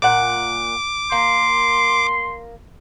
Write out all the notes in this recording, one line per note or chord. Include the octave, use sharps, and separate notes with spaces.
A#2 F#5 D6
A#3 C6